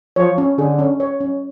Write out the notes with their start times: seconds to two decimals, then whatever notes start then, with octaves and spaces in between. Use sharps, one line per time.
0.16 F3 C#5
0.38 C#4
0.58 D3 G#4
0.79 C#4
1.00 C#5
1.20 C#4